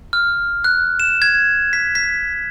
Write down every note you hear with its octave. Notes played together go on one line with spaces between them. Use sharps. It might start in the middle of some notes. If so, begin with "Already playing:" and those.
F6
F#6
E7
G#6
B6
B6